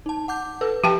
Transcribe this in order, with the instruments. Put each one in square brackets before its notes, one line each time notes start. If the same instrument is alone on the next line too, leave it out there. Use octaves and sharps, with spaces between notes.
[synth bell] D#4 A5
F#5 D6 G6
[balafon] A4 [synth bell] B4
[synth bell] F3 [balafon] G4 G5 A5